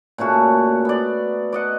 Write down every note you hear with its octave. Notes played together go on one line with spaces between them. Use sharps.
A#2 C#3 A3 F#4
B3 D5
D5 D#5 F#5